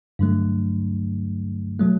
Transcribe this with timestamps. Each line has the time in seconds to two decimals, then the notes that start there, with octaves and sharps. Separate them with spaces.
0.19 G2 D3 F#3 A3
1.80 B2 F#3 A3